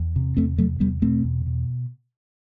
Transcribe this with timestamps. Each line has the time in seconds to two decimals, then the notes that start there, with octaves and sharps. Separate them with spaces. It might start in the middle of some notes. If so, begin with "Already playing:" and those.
Already playing: E2
0.16 C3
0.37 E2 A3 C4
0.58 C3 F#3 A3
0.80 E2 G3 B3
1.02 B2 A3 C4
1.25 E2
1.46 B2